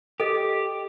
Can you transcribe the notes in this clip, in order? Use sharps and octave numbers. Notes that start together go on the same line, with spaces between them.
G4 A4 D#5